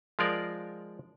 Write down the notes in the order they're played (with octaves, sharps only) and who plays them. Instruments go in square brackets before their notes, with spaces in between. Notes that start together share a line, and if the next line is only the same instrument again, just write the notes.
[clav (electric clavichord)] F3 G#3 F4 A#4 D5